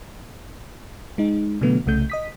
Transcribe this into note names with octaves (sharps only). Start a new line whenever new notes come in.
G#3 D#4
B2 D3 E3 F#3 A3 B3
C2 C#3 A3 G6
D#5 D#6 B6